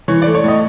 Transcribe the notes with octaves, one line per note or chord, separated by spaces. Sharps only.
E3 C#5
D5
A3
C#5
A2 D#5